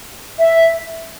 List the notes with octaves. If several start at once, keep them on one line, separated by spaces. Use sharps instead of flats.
E5